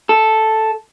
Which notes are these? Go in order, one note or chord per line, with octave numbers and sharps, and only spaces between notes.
A4